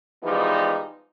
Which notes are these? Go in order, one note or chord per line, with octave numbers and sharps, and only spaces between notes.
E3 F3 G3 G#3 B3 D#4